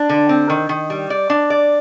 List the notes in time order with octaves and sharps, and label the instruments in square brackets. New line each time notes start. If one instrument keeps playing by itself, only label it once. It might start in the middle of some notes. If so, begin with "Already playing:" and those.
Already playing: [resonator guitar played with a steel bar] D4
D3
C4
D#3
D#3
G3
D5
D4
D5